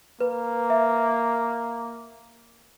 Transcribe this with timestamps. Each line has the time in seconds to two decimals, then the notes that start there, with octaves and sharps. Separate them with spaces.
0.21 A#3 B4
0.70 E5